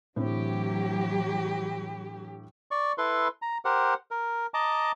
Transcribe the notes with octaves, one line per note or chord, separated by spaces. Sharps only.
A2 D3 E3 F#3 C4 G4
D5 C#6
E4 A4 B4 C6
A#5
G4 A#4 C5 F#5
A#4
D#5 A5 A#5 D6